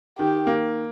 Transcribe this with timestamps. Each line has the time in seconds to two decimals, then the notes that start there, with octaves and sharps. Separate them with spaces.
0.19 D#3 G4
0.47 A#3